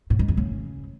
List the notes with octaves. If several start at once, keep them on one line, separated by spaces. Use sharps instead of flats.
A2
G#2
F2
C#3